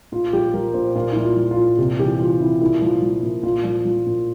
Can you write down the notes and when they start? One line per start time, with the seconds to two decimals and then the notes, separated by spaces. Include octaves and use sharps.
0.12 A#2 F4
0.33 F3 G4
0.54 F3 A#4
0.74 A#2 C5
0.95 A#2 F4
1.12 F3 E4
1.23 F4
1.36 F3
1.51 F4
1.57 A#2
1.78 C3 G4
1.99 E3 G4
2.20 E3 F4
2.40 C3 E4
2.61 A#2 E4
2.82 F3
3.02 F3
3.23 A#2
3.43 A#2 F4
3.64 F3
3.85 F3
4.07 A#2